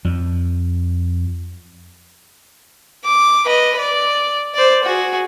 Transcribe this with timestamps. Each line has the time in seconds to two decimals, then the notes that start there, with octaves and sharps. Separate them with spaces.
0.05 F2 F3
3.04 D6
3.45 B4 D#5
3.79 D5
4.54 C5 D5
4.84 F#4 G#4